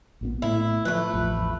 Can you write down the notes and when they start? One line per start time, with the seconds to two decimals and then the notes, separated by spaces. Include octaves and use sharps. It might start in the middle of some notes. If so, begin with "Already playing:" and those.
0.21 A#1 A#2 B3
0.42 A2 A3 E4
0.85 F3 A3 B4
1.14 A1 E2 F3